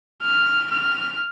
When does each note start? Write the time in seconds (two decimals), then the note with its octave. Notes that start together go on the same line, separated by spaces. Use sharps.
0.22 F6
0.71 F6